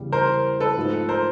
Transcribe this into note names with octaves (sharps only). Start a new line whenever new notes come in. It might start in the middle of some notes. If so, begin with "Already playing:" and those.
Already playing: E2 C#3 E3 G3
A#4 C5
A4 B4
G#2 F3 A3
A#4 C5